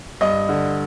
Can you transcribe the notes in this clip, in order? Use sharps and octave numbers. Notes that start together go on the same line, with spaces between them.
G2 D#5
D3